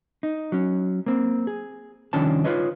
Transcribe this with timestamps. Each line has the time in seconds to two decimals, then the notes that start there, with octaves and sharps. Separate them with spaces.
0.23 D#4
0.52 F#3 C#4
1.06 A#3 C4
1.47 G#4
2.13 C2 D#3 F3 C#4 D4 A5
2.44 D#4 F4 B4 C#5 D#5